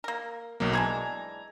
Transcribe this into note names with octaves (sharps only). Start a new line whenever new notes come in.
A#3 A#4
B1 F#3 A#3
E3 G#3 D4 A#5 G#6